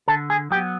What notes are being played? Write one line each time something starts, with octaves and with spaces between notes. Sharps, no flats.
D3 A4
G#4
F#3 B3 G4